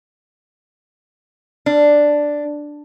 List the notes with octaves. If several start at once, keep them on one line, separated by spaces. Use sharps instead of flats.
D4